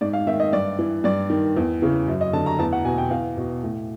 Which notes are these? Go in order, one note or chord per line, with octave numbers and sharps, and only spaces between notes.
G#2 D5
F5
D#3 E5
D#5
G2 D5
E3
G2 D5
D#3
E2
C#3 E3
F#2
D#5
D3 A5
A#5
E2 A5
F#5
B2 G#5
G5
E2 F5
B2
A2